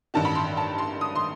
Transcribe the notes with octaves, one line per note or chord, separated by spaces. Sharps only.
A1 G2 D#3 A5
B5
C6
A5
C6
D#6
C6